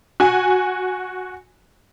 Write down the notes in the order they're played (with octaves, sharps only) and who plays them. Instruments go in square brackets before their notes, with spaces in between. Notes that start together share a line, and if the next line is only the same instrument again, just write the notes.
[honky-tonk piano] F#4 G#5